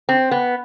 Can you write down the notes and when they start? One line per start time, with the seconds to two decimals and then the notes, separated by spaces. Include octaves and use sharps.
0.09 C4
0.31 B3